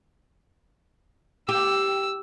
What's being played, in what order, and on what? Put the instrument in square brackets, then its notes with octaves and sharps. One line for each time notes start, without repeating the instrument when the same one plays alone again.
[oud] G4 [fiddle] E6